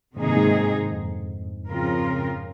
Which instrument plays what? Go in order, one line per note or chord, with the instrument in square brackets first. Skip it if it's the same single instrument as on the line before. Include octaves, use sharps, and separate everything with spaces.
[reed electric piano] G#2 [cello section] C3 D#3 A#3 D#4 G#4
[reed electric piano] G2
G#2
F2
[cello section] C#3 F3 C4 F4 A#4